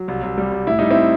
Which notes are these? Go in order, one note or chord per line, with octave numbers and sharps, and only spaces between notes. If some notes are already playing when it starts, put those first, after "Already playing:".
Already playing: F#3
C2
C2
G3
C2
A2 E4
G3 D#4
C4 E4